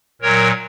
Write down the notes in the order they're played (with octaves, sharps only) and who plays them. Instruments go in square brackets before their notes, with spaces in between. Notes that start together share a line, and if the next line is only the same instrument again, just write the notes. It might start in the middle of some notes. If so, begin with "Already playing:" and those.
[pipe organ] A#2 F#3 A#4 C#5